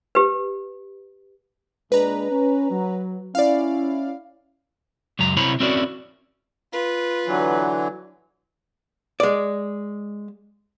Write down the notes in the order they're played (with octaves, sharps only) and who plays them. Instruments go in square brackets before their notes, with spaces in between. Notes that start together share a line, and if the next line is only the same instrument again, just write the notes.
[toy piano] G4 B4
[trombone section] A#2 G#3 D4 [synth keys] B4 A#5
[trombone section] C#4
F#3
[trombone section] C#4 E4 [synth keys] D5 F5
[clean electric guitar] C#2 F#2 F#3 A#5
C3 E4 C5 C#5 A#5 B5
C4 C#4 E4 F#4 A#4 D5
[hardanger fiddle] F4 B4
[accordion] D3 E3 F#3
[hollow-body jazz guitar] G#3 D5